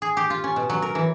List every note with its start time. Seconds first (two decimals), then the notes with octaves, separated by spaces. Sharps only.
0.02 G#4
0.17 G4
0.30 F4
0.44 C#4
0.56 B2
0.70 F#3
0.82 A#4
0.95 E3